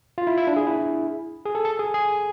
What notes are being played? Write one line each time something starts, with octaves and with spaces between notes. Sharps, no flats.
F4
E4
E4
D4
G#4
E4
G#4
A4
A4
G#4
G#4